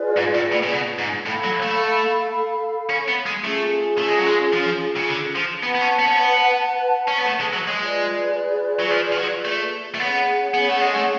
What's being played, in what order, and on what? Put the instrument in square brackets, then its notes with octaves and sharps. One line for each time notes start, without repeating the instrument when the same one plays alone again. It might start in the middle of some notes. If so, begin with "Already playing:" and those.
Already playing: [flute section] F4 G#4 B4 D5
[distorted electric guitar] G#2
A2
A2
C#3
B2
G#2
[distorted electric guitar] A2 [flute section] A4 F5 B5
[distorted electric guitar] F#3
A3
C#4
B3
G#3
[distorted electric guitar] A3 [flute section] C#4 F4 G#4
[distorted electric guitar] A3
G#3
F#3
G#3
F3
C#3
D3
F3
[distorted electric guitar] B3 [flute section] B4 F#5 A5
[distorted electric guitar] B3
C#4
B3
C#4
B3
C#4
B3
A3
G#3
F#3
G#3
[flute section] F4 G#4 B4 D5
[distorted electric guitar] F#3
F3
F3
F#3
A3
A3
[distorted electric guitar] B3 [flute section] C#4 G#4 C#5 F#5
[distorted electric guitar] B3
A3
G#3
A3